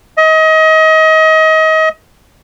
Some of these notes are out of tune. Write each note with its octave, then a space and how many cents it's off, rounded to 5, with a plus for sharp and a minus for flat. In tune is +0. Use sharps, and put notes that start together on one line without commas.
D#5 +30